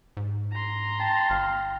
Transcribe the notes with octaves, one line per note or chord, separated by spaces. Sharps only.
G#2
A#5 C6
G5 A5
G1 F5